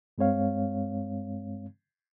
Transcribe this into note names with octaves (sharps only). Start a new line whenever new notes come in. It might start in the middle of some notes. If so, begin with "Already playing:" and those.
G2 G#3 C4 C#5 F5